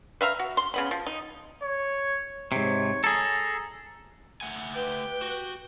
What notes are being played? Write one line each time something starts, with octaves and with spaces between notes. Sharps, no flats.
B4 E5 F5 A#5
F#4
C6
C#3 B3 B5
F3
D#4
C#5
G#2 C3 C#5
G#4 A4 A#5
A3 F#5 G#5
G4 B4 G5
F#4